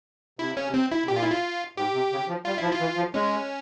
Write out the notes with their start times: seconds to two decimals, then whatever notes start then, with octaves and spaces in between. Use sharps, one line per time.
0.39 C3 E4
0.53 C#3 C#4
0.65 C3
0.74 C4
0.91 E4
1.04 C3
1.08 A#2 G4
1.16 F4
1.23 E4
1.30 F4
1.77 G#2 G4
1.93 C3
2.12 C#3
2.28 F3
2.45 G3 F4
2.58 F3 E4
2.71 F4
2.80 E3
2.97 F3
3.14 G#3 C#4